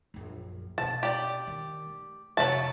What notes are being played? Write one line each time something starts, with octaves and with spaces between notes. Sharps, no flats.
A#1 F#2
B2 D4 A5
G4 D5
D#3
A3
F2 C3 F#3 E5 A5